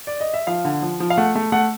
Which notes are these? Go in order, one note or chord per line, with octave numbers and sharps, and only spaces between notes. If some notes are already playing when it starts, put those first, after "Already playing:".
D5
D#5
E5
F3 F5
D3
F3
F3
F5
A3 F#5
A3
A3 F#5